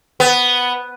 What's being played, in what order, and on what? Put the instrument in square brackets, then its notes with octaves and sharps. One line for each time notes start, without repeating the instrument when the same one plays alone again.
[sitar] B3